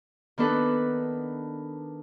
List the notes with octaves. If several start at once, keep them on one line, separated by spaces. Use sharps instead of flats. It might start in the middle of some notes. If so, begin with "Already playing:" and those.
D#3 B3 D4 A4 B4